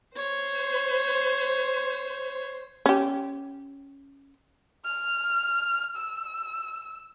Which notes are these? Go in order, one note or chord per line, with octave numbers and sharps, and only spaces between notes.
C5 C#5
C#4 G4
F6
E6